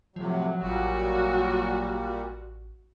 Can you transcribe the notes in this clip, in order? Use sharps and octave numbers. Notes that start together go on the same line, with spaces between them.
A2 C3 F3 F#3
A1 A#2 G3 F#4